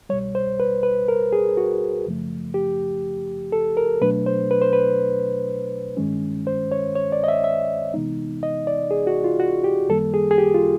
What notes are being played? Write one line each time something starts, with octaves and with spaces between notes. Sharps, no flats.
C2 B2 G3 C#5
C5
B4
B4
A#4
G#4
F#4
F#2 C#3 F3 A3
G4
A4
A#4
B2 F#3 A3 D4 B4
C5
B4
C5
B4
G2 D#3 G#3 C#4
C5
C#5
C#5
D5
D#5
E5
E5
C3 E3 G#3 B3 D#4
D#5
D5
G#4
F#4
F4
F#4
G4
F#2 D#3 G3 A#3 A4
G#4
G#4
G4
F4